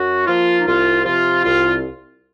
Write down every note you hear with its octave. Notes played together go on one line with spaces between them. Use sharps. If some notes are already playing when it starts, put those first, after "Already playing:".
Already playing: F#2 F#4
F3 A#3 F4
D#4
C2 F4
C3 F3 F4
C2 F4